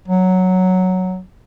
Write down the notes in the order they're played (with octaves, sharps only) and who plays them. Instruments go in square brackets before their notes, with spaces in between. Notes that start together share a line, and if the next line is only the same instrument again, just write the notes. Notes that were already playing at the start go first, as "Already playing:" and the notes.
[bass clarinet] F#3